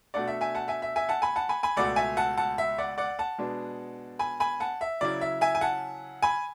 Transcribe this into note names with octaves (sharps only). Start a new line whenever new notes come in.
B2 A3 D4 D5 F#5
E5
E5 G#5
F#5 A5
E5 G#5
E5
E5 G#5
F#5 A5
G#5 B5
F#5 A5
G#5 B5
G#5 B5
C#2 B2 A3 D5 F#5
E5 G#5
F#5 A5
F#5 A5
E5
D5 F#5
D5 F#5
F#5 A5
B2 G#3 B3 D4
G#5 B5
G#5 B5
F#5 A5
E5
C#3 F#3 C#4 E4 D5
E5
E5 G#5
G#5
F#5 A5
G#5 B5